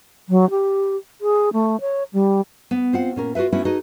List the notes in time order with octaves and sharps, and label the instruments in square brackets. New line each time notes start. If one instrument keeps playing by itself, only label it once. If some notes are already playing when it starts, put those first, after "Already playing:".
[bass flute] F#3
G4
G#4
A3
C#5
G3
[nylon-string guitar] B3
C4 F4 F#5
A#2 C#4 A#4
F4 F#4 A4 B4 E5
A3 B3 C#4 D4 E4 F#4
D#4 F#4 G#4 A4 B4 D#5